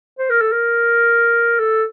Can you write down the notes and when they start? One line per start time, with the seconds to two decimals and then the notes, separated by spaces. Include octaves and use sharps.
0.19 C5
0.30 A#4
0.41 A4
0.52 A#4
1.59 A4